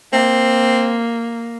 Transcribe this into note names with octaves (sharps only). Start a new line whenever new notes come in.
A#3 C4